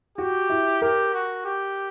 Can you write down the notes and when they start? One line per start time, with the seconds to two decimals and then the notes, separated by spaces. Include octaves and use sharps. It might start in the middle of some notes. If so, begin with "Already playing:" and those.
0.18 F#4 G4
0.50 E4
0.82 G4 A#4
1.14 F#4
1.45 G4